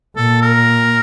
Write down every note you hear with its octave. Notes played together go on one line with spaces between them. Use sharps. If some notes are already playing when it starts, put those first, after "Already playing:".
A#2 A4
A#4